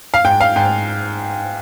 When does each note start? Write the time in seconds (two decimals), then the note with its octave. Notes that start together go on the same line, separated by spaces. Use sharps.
0.14 F5
0.25 G#2 G5
0.41 F5
0.56 G#2 G5